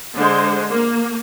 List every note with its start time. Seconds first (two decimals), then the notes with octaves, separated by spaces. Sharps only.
0.16 D3 G#3 C5
0.69 A#3